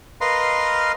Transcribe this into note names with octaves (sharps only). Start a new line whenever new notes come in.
A#4 B4 D#5 F5 C6